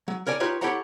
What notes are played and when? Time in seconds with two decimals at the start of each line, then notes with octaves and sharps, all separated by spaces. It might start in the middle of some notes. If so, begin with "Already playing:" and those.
0.08 F#3
0.27 A#4 C#5 D5 G#5
0.40 D#4 F4 G4 B4 C#5
0.61 E4 G4 A4 C#5 F#5 A#5